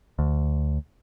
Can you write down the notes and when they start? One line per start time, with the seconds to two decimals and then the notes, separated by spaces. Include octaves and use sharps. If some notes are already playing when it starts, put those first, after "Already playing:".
0.19 D2